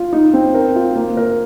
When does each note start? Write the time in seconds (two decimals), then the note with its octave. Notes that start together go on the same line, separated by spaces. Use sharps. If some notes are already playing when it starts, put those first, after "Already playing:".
Already playing: F4
0.13 D#4
0.34 C4
0.54 A#4
0.76 F4
0.96 A#3
1.17 A#4